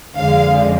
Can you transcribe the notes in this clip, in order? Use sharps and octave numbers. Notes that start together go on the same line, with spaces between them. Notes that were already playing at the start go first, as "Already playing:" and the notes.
F2 D3 G#3 F5